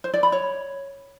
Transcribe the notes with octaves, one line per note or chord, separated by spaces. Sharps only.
C5
D5
B5
C#5